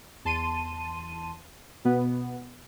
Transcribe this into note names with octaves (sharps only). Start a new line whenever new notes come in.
E2 A5 C6 D#7
B2 B3